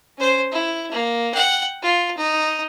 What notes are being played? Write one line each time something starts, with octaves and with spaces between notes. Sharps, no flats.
C#4 C5
E4
A#3
F#5 G5
F4
D#4